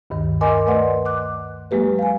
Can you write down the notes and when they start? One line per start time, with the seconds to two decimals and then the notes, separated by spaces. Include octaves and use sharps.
0.10 D2 G2 D#3
0.41 A#4 D#5 G#5 C6 D6
0.67 A3 B4 D5 D#5 F#5 C6
1.05 D6 F#6
1.71 F#3 G#3 A#3 G4 B4
1.99 F5 G#5